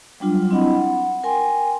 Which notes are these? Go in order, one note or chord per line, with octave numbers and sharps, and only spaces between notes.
F#3 G3 D4 F4
C4 E4 D#5 F#5 B5
F#5
A#4 G5 G#5 C6